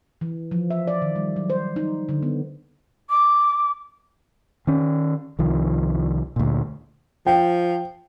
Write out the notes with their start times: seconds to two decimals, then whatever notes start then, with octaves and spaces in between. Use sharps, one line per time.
0.21 E3
0.51 F3
0.70 E5
0.88 D5
1.02 D#3
1.16 G3
1.36 F#3
1.50 C5
1.76 D#4
2.09 D3
2.23 B3
3.10 D6
4.67 D#3 C#4
5.39 C2 D#3 F3
6.36 D2 A#2
7.26 F3 G5